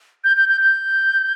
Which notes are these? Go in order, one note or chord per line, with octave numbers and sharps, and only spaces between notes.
G6
G6
G6
G6